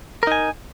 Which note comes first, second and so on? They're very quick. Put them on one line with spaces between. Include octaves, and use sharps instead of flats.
A#4 D#4 G#5